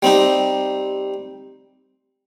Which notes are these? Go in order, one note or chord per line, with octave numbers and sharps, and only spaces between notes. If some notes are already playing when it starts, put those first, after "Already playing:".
G3 C4 D#4 G4